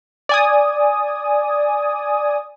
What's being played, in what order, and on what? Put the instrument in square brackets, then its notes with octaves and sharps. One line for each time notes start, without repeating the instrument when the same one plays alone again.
[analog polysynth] D5 G#5 D#6